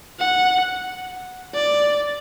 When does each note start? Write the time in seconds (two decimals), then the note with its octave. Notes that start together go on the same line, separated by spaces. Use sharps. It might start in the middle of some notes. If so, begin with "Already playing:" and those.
0.19 F#5
1.55 D5